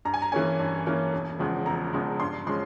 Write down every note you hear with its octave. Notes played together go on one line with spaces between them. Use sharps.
G2 A#5
G#5
A#5
E3 A#3 C#4 G#5
G2
E3 A#3 C#4
E1
E2 C#3 F3 G#3
E1 A#5
E2 C#3 F3 G#3
G2 C6
F3 G#3 C#4 C6